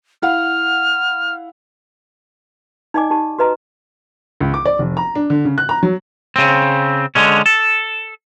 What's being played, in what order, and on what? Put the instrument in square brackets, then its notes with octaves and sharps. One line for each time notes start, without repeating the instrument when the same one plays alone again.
[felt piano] E4 F5 F#5 [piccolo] F6
[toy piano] D#4 D5 D#5 G#5 D6
D#4 G4 A5
F#4 B4 D#5 A#5
[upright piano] C#2
D6
D5
F1
A#5
D4
D3
C#3
F#6
A#5
F#3
[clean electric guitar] C#3 C4
D3 G#3 C#4
A4